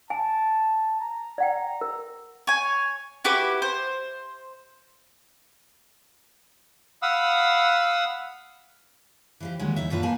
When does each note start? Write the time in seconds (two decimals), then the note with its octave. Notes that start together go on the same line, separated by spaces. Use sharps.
0.10 G#5 A5
1.00 A#5
1.38 D5 F#5 G5
1.81 A#4
2.47 C#5 G#5
3.24 E4 F#4 G4 B4
3.62 C5
7.02 F5 F#5 B5 D#6 E6
9.40 E3 F3 G4
9.59 D2 D3 D#3 F#3 G#3 A#3
9.76 E2 D#4 E5
9.90 F#2 A#2 D3 F4 A4 B4
10.03 A#3 D#4 G#5 A5